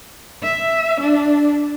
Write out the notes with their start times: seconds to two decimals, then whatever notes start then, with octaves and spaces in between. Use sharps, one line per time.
0.43 E5
1.01 D4